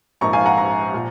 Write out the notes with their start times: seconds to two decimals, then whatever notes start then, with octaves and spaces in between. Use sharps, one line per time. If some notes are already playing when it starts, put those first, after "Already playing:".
0.21 A#1 G#2 F3 A#3 D#4 A#5 C#6
0.33 F5 G#5
0.46 F#5 A#5
0.58 A#5 C#6
0.94 A#2 F3